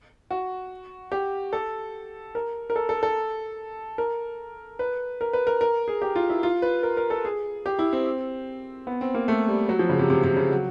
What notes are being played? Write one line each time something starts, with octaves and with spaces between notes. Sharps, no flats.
F#4
G4
A4
A#4
A#4
A4
A4
A4
A#4
B4
A#4
B4
A#4
A#4
G#4
G4
F4
E4
F4
B4
A#4
A#4
A4
G#4
G4
E4
C4
B3
C4
A#3
A3
G3
F#3
F3
C#3
C3
C3
C3
C#3
F#3